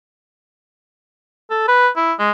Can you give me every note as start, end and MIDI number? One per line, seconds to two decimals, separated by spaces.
1.50 1.63 69
1.68 1.88 71
1.96 2.13 64
2.19 2.32 56